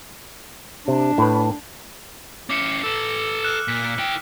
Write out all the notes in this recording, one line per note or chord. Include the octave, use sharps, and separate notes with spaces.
C3 D4
A2 B4
C#4 E4 D6 C7 C#7
A4 B4 E6
F6 F#6 E7
A#2 B6
E4 G5